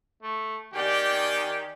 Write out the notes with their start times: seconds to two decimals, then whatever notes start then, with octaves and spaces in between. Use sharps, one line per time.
0.23 A3
0.74 D#3 G4 D5 G5 G#5